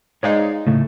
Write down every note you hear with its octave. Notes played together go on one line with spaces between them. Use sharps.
G#2 G#3 D#4 C#5 D5 F5
A2 C#3 A3